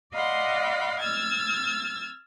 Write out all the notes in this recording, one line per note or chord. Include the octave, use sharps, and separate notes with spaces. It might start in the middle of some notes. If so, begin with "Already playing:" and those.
D5 D#5 F5 F#5 B5 C6
E6 F6 G#6 A6